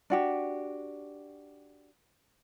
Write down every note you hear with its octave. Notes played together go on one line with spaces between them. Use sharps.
D4 F#4 G4